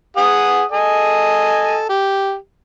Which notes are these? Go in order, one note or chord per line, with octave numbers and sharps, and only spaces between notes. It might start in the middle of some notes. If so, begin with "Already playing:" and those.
G#4 F#5 D#6
A4 D#5 G#5
G4